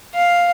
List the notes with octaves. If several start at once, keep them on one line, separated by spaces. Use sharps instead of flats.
F5